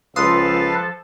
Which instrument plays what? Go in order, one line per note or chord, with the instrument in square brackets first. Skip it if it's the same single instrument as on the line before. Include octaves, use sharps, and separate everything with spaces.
[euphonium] C#2 [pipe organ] F3 A4 A5 [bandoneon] B4 F5 [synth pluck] C6 D#6